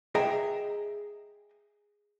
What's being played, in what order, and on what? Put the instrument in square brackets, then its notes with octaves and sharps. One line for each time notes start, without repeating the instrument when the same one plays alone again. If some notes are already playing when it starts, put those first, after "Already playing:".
[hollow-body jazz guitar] G#4 D#5 E5 G5 A#5